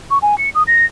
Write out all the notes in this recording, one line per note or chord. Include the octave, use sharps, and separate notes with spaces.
C#6
G#5
C#7
D#6
A#6